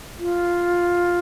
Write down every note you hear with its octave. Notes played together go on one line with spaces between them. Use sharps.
F4